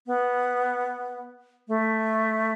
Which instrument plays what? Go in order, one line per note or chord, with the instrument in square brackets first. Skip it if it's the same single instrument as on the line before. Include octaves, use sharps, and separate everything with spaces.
[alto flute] B3
A3